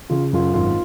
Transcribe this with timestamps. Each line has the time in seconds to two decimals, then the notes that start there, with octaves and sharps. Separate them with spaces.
0.10 C#3 F4
0.33 F#2 F4
0.54 G#1 F4